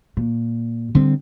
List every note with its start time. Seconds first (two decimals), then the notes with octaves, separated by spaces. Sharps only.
0.17 A#2
0.95 D3 G3 C4